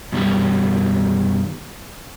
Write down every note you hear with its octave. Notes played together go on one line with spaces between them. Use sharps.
F#2 B2 D#3 F#3 G3